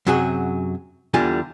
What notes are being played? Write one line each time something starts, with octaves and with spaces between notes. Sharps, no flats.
F#2 C3 F#3 F#4 G#4
E2 D3 G3 F4 G#5